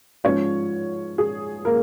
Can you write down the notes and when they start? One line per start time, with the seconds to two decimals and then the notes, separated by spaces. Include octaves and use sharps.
0.24 G#2 F3 G#3 C#4 C#5
1.18 G#4
1.65 A#3 A#4